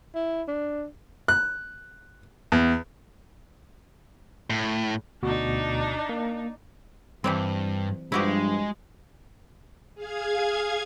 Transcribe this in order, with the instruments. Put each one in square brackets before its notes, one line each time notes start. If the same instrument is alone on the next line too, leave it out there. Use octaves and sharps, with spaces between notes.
[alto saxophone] E4
D4
[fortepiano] F#6
E2
[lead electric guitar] A2
[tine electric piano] D2 B2 F#4 [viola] D4 D#4
[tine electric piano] A#3
[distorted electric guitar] G2 [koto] E3 G3 C4
[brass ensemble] G2 F3 [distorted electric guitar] G#3 [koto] E4 F#4 G4
[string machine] G#4 F5 G#6